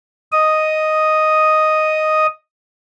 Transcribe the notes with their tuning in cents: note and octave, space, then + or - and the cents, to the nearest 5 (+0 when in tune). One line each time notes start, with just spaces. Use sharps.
D#5 +0 D#6 +0